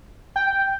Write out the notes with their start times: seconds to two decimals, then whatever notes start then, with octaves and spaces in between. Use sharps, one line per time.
0.36 G5